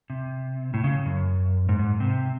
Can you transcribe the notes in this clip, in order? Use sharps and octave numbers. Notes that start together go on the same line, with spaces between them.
C3
A2
C#3
F#2
G#2
G#2
C3